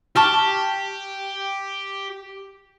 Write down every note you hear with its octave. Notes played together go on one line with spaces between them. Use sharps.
G4 A5 C#6 F6